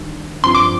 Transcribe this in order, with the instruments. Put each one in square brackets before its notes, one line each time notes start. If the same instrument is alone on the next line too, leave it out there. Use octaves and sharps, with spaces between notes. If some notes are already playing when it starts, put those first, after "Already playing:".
Already playing: [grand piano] D#3 G3 D4
[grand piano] G2 F3 C4 [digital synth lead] C6
[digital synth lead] D6